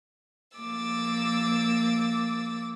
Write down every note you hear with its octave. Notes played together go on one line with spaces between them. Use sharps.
F3 A#3 D6 E6 A6